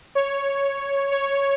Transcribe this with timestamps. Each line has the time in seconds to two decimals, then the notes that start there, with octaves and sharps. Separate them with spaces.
0.15 C#5
1.12 C#5